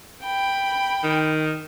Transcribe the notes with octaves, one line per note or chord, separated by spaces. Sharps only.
G5 B5
D#3